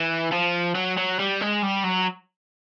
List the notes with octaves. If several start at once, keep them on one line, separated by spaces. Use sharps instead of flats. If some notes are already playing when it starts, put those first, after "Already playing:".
Already playing: E3
F3
F#3
F#3
G3
G#3
G3
F#3